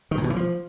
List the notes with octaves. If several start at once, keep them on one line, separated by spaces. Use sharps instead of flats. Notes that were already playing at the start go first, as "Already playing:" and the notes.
D#3
A2
B2
E3
F3